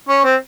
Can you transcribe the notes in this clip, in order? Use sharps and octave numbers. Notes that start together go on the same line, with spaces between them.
C#4
C4